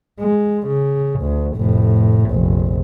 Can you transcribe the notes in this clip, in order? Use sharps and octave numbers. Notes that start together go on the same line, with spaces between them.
G#3
C#3
D2
F1 A2
F1 A#1